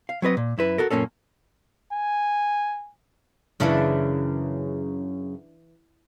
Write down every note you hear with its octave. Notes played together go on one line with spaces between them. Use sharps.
F5
F#3 C4 B4 D#5
A#2
F#2 E4 B4
F#4 A4 A#4
F#2 A#2 A#3 C#4 A4
G#5
F#2 C#3 E3 D4 E4 B5